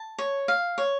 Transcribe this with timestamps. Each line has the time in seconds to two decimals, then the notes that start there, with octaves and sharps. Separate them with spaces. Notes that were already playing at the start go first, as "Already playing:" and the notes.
Already playing: A5
0.18 C#5
0.48 F5
0.78 C#5